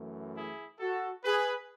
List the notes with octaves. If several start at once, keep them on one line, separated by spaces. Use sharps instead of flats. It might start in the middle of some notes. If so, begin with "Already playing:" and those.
Already playing: F#2 E3 A3
E4 G#4
F#4 A4
G#4 B4